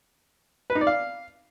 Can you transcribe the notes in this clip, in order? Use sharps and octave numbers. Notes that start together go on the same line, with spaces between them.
B4
D#4
D5
F5